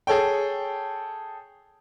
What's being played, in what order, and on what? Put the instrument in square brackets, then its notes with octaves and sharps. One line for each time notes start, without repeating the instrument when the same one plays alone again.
[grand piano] G#4 A4 C#5 G5